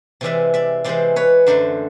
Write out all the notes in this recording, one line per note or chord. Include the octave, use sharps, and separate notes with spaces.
C3 E3 G#3 D5 E5
D5 E5
C3 E3 G#3 C5 D5
B4 C#5
F#2 D3 F#3 A3 C5 D5